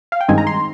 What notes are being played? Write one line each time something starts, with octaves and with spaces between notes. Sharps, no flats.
F5
G5
G2 D#3 G#3 C4 D#4 G#5
A#5
C6